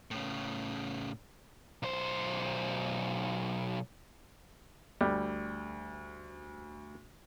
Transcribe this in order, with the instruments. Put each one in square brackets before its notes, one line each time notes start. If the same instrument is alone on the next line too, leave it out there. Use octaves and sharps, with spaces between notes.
[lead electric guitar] A2 C#3
B1 C5
[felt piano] D2 [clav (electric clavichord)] G3